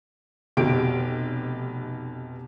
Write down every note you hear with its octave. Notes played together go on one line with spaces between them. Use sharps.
F1 B2 G4 D7